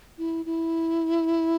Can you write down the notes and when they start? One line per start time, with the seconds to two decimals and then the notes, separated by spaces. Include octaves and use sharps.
0.18 E4
0.45 E4